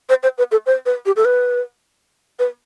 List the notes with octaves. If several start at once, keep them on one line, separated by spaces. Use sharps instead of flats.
C5
C5
B4
A4
C5
B4
G4
A4
B4
B4